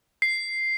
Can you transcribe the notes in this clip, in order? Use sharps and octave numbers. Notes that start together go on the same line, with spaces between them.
C7